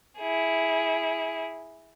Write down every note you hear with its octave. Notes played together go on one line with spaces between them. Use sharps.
E4 G#4